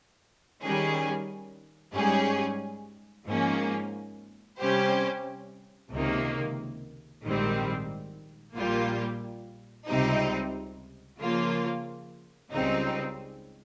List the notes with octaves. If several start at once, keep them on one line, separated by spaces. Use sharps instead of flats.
D#3 G3 C#4 G#4
G#2 G3 C#4 G#4
G#2 F3 A#3 C#4
C3 G3 C#4 G4 C5
C#2 C3 D#3 A#3
A#1 G#2 D#3 G3 C4
A#1 A#2 G3 A#3 F4
C#2 C3 G3 C4 D#4
C#3 F3 A#3 F4
C#2 C#3 G3 C4 D#4